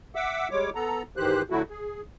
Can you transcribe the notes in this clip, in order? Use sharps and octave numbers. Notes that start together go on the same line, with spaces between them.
E5 F#5 D6 E6
G3 G#3 C#5 D6
B3 A4 A#5
G#2 D#3 E3 G4 C5 F#6
D3 F#3 A3 E4 F#4
G#4